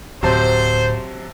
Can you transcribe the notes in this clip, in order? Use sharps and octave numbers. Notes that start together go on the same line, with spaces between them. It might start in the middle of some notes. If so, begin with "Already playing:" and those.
D1 C3 F#3 C5 A5